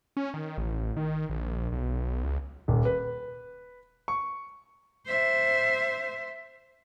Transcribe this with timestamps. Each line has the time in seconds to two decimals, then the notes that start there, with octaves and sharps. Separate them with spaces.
0.17 C#4
0.34 D#3
0.58 A1
0.97 D#3
1.30 A#1
1.72 B1
2.24 C#2
2.68 D#1
2.85 B4
4.08 C#6
5.07 C5 E5